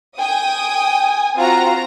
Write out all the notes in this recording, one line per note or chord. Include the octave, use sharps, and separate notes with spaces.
G5 G#5 D#6
C4 F4 F#4 A#5